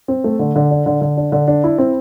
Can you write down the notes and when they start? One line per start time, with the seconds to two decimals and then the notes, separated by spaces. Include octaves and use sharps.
0.08 C4
0.24 A3
0.39 D3
0.56 D3
0.71 D4
0.86 D3
1.01 D3
1.17 D4
1.32 D3
1.48 D4
1.64 E4
1.78 C4